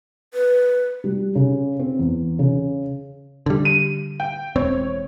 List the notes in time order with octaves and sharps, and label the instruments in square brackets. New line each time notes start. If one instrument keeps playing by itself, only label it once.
[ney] B4
[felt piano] G3
C#3
C4
E2
C#3
[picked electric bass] D3 G3
[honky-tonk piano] D#7
G5
[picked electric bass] E1 C4 [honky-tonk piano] C#5